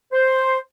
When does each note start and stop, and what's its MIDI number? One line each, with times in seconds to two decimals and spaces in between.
0.13 0.58 72